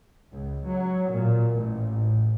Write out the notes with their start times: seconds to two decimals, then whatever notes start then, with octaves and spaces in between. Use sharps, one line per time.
0.33 C#2
0.67 F#3
1.11 A#2
1.55 A1